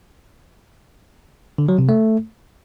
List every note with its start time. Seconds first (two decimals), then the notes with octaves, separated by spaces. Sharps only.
1.58 D3
1.69 F#3
1.79 C3
1.89 A3